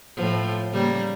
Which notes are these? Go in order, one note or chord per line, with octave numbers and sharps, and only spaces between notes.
A2 F3
C#3 G3 A#3